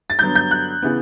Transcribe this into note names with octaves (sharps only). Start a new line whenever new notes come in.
A6
G2 D3 F#3 B3 G6
G6
F#6
C#3 E3 B3